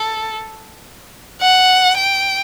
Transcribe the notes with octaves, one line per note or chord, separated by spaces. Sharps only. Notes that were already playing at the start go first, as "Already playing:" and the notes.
Already playing: A4
F#5
G5